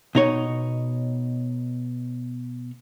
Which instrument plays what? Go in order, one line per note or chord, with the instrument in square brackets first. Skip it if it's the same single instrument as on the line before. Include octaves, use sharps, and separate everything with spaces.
[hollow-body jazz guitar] B2 D#4 C#5